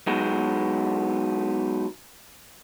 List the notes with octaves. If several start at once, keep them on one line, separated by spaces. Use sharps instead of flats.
F#3 G#3 B3 D#4